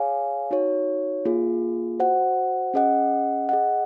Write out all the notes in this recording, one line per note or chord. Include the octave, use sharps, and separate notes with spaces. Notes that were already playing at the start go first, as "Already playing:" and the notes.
Already playing: G#4 C#5 F5 G#5
D#4 F#4 C#5
A#3 F4 G#4
F#4 C5 F#5
C#4 G#4 D#5 F#5
G#4 D#5 F#5